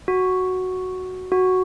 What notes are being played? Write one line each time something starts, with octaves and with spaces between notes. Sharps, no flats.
F#4
F#4